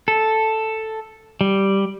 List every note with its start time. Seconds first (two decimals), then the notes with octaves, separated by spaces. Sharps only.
0.08 A4
1.41 G3